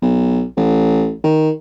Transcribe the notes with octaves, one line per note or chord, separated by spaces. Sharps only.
B1
A1
D#3